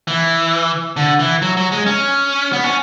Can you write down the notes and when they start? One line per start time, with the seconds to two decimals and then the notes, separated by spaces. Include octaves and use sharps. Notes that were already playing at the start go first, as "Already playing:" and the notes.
0.07 E3
0.97 D3
1.19 E3
1.42 F#3
1.57 F#3
1.72 G#3
1.86 C#4
2.53 B3
2.64 C#4